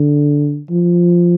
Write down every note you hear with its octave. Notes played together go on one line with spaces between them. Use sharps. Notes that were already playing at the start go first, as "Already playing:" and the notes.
Already playing: D3
F3